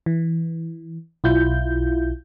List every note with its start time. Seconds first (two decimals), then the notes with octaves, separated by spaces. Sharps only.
0.06 E3
1.24 B1 E4 F4 G6